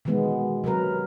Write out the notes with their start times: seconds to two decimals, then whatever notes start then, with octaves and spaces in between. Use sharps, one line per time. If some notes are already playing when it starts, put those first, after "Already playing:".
0.05 B2 D#3 E3 G#3 B3
0.64 C3 F#3 A#4 B4